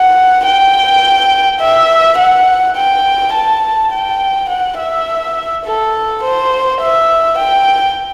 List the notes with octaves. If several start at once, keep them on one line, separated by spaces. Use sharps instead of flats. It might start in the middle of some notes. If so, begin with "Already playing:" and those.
Already playing: F#5
G5
E5
F#5
G5
A5
G5
F#5
E5
A4
C5
E5
G5